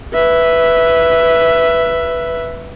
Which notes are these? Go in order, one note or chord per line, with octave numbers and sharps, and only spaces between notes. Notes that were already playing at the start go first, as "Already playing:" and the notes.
B4 E5